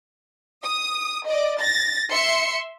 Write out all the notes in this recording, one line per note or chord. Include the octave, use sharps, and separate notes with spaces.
D#6
D5 D#5
A6 A#6
E5 C6 C#7